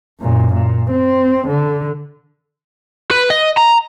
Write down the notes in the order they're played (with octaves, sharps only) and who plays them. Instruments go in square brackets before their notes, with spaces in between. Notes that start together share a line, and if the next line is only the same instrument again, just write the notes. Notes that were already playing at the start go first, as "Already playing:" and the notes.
[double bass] F#2 A#2
A#2
C4
D3
[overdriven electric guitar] B4
D#5
A#5